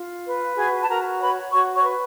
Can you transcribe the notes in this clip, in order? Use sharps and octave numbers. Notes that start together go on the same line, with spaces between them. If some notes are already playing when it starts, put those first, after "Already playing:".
Already playing: F4
B4
F#4 G#4 G#5
A5
F#4 A#4 A#5
B4 C#5 B5
F#4 C#5 C#6
C#5 C#6
B4